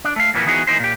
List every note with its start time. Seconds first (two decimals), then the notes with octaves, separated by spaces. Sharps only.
0.05 D4
0.16 A3 F5
0.34 F2 A#2 E3 A#3 B3
0.46 E3 B3 D#4 F#4 G#4
0.67 E3 A#3 D#4 C5
0.80 A#2 G4